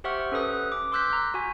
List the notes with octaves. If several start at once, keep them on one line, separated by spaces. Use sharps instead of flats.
G4 C5 E5 F#5 C#6 F6
C#4 A4 B4 D#6 F#6
D6
C6 D6 E6 F#6 G6 B6
A#5
F#4 G#5